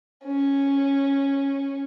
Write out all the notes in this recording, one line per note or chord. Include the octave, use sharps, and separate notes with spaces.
C#4